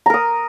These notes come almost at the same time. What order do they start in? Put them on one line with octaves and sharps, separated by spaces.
A#5 A#4 D#6